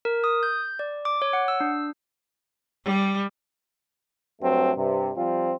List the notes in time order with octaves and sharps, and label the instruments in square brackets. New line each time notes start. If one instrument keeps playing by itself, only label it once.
[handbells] A#4
D#6
G6
D5
D6
C#5
F#5
E6
D4
[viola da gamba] G3
[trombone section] G2 F#3 A3 C4
G2 C3
F3 G3 C4 F4